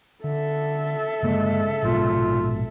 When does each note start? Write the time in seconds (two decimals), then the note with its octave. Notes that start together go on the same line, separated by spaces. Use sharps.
0.24 D3 A4 E5
1.23 G1 C#3 G#3 A#3
1.83 A#1 G#2 B2 F4